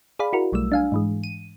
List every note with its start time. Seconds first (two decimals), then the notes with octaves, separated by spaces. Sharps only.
0.19 G#4 D5 F5 B5
0.33 E4 F#4 A#4
0.52 B1 F#3 G3 A3 E6
0.72 D4 F5 G#5
0.92 G#2 E3 G#3
1.24 D#7